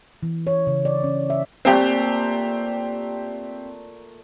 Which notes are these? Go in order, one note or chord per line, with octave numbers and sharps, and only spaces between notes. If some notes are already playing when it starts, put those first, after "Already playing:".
E3
C#5
C#3
D5
C#4
E5
A#2 A3 C4 G4 A#5